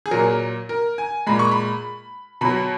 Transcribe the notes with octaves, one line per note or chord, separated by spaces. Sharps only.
G#4
A#2 F#3 A#4
A#4
G#5
A#2 G#3 B5
C#6
B5
B2 F#3 B5